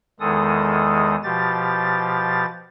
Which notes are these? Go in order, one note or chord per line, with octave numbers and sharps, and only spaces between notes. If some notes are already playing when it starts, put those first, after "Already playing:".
E2 D#3 G#3 A4 D#6
B2 F3 G4 A6